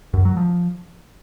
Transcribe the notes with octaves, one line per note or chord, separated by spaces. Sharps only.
F#2
F#3
F3